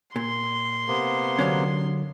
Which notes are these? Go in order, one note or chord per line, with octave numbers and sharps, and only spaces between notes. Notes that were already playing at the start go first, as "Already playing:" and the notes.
A#2 C6
C3 A#3 B3
D3 F#3 C#4 D4 F5